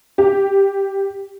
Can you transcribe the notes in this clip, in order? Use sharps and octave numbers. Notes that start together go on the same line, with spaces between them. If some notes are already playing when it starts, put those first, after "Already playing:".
G4